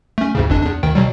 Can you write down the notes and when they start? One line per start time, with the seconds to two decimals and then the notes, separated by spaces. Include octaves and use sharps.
0.18 A3 C#4
0.35 D2 G#2 C#3
0.50 G1 F2 D4
0.62 E2 D4
0.83 D2 D#3 G5
0.95 B2 F#3 G3